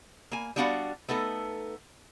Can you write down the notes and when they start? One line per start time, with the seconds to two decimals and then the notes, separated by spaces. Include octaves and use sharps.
0.31 A#3 G#5
0.56 G3 B3 D4 F#4 F5 F#5
1.08 A3 B3 D#4 A4